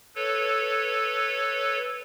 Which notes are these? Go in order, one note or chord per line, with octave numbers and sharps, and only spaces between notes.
A4 B4 C#5